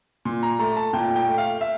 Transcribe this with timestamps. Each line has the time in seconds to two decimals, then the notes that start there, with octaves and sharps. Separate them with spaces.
0.25 A#2
0.43 A#5
0.59 A3 A#5
0.76 A5
0.93 A#2 G5
1.16 G5
1.27 A3
1.38 F5
1.61 E5